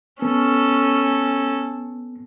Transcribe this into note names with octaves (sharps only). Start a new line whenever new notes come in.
B3 C#4 A4